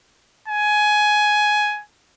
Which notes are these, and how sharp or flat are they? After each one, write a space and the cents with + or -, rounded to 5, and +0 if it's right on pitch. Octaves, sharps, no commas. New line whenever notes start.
G#5 +15